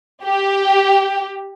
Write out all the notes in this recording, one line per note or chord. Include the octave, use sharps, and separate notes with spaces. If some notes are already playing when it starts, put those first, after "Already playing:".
G4